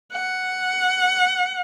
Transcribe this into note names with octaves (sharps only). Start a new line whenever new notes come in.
F#5